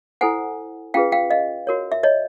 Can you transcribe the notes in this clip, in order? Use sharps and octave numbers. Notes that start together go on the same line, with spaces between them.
E4 A4 C5 F#5 G#5
C#4 F4 G#4 B4 F5 G5
F5 G5
D#5 F5
F#4 A#4 C#5
E5
C#5 D#5